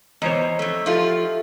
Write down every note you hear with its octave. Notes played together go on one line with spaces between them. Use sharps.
E2 D#4 C5 C#5
F2 A3
F3 F4 G4 A4 E5